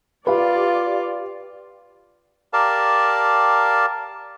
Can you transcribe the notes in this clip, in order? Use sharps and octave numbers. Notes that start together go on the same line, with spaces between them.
F4 G4 B4 D5 F5
G4 A#4 D5 F5 A5